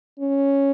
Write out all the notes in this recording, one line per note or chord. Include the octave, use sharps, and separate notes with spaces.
C#4